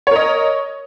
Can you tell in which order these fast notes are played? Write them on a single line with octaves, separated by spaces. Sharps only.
C#5 A#4 D#5